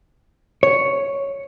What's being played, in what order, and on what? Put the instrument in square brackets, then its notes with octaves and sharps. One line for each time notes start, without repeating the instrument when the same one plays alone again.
[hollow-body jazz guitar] C#5